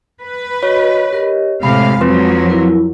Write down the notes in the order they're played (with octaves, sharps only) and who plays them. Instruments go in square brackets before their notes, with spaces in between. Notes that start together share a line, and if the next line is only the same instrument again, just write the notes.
[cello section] B4
[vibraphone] F#4 D#5 [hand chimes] C#5
[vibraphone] G4 A#4 D#5
[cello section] A2 C3 F5 [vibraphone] G#3 [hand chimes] B5
[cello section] F2 F3 F#3 [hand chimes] C4 B4 C6
[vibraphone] E4 A#4